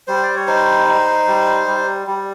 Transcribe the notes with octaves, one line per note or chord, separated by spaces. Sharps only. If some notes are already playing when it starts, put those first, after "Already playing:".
G3 C5
D5
C#5
D#4 C5
D#4
G3
G3
G3